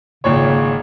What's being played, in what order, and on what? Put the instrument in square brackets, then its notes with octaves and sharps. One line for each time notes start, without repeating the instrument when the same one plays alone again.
[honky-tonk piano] G#1 A#2 C#5 [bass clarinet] C#3